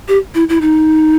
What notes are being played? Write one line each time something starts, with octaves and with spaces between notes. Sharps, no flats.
G4
E4
E4
D#4